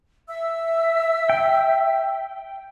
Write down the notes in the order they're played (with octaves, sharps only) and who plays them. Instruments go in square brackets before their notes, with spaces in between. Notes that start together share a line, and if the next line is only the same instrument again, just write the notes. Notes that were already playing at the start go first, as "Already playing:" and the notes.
[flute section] E5 E6
[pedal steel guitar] G5